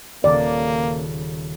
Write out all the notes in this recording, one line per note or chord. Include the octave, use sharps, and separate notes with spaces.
D#1 C#3 A#3 A4 D5